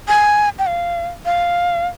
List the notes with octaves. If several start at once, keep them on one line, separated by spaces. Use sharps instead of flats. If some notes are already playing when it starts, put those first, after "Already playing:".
G#5
G5
F5
F5